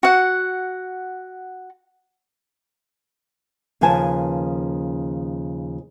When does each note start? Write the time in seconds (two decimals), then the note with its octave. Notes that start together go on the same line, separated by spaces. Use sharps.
0.03 F#4 F#5
3.81 D#2 C#3 F3 B4 G#5 A5